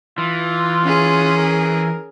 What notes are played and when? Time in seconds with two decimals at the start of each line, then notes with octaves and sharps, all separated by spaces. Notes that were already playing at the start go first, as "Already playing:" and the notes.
0.18 E3 F4
0.84 C#4 G#4
1.37 A#4